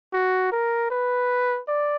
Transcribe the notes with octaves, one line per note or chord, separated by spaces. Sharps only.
F#4
A#4
B4
D5